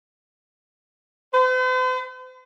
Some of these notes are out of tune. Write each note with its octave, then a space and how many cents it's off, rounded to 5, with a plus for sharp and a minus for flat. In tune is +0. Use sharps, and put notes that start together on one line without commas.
C5 -45